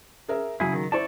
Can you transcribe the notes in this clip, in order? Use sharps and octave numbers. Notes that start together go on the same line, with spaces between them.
G#4 A#4 E5
C#3 F#3 E4 G#4
D#3
E4 C5 D5 A5 C#6